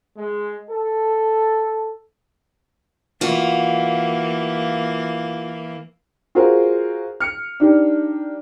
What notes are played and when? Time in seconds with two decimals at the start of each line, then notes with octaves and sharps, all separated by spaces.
0.17 G#3
0.70 A4
3.21 E3 A#3 F4 F#4
6.35 F4 F#4 G#4 A#4 C5
7.20 F6 C#7
7.60 D4 D#4 G4